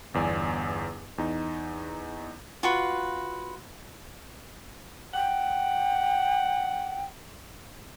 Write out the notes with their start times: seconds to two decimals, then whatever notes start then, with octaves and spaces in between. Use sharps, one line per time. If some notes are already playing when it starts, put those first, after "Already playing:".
0.14 G1 E2 D5 G#5
1.18 E2 D#4
2.63 F4 F#4 B4
5.14 F#5 G5